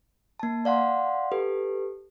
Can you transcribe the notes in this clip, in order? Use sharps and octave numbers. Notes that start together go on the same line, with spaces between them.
A#3 A5
D5 F5 F#5 C6
G4 A4 B4